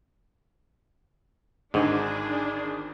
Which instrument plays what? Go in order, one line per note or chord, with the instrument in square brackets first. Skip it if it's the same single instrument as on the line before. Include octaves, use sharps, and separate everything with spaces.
[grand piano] G#1 D3 D#3 [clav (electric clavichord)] G#2 [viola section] D4 [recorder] G#4